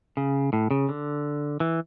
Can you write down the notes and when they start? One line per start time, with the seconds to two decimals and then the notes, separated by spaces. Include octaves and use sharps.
0.17 C#3
0.53 A2
0.71 C#3
0.89 D3
1.60 E3